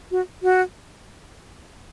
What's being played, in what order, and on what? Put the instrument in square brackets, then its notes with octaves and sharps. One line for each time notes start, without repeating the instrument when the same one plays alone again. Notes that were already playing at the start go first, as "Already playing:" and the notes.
[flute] F#4
F#4